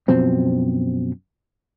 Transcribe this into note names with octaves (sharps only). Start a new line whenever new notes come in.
F#2 B2 F3 C4